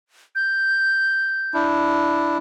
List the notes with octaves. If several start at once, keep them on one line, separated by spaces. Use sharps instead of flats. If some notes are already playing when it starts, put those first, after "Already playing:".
G6
D4 E4